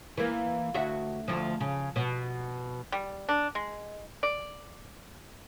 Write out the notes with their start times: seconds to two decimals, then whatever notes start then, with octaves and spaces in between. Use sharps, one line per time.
0.18 E3 A#3
0.74 D2 F#4 E5
1.28 D2 F3
1.61 C#3
1.96 B2
2.92 G3
3.29 D4
3.55 G#3
4.23 D5